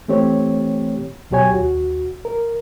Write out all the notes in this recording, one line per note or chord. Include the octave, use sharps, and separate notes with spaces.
E3 A3 C4 G4 C#5
C#2 B2 F#3 G4 C#5 G#5
D#2 F#4
A#4